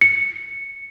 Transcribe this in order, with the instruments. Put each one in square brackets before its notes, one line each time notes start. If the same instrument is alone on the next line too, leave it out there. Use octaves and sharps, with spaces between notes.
[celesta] C#7